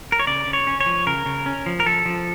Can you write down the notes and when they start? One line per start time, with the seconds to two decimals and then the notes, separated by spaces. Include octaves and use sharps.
0.12 A#4
0.19 C#5
0.27 C#3 D5
0.47 C#3
0.53 C#5
0.67 C#4
0.81 C#5
0.86 F3
1.07 C#3 A#4
1.26 C#3
1.46 C#4
1.66 F3
1.80 A#4
1.86 F3 A4
2.06 F3